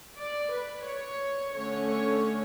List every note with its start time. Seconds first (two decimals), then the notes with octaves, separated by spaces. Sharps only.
0.17 D5
0.51 B4
0.85 C#5
1.54 D3 A3 C#4 C#5
1.89 C#5